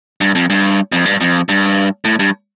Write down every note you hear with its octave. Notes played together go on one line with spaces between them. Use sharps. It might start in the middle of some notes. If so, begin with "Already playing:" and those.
G2
F2
G2
F2
G2
F2
G2
A2
G2